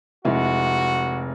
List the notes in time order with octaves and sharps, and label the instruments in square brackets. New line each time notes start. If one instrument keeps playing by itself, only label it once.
[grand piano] F1 G#3 E4 [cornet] F#4